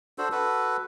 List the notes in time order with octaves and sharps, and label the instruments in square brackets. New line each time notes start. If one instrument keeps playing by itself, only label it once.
[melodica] D4 F#4 A4 C5
F#4 A4 B4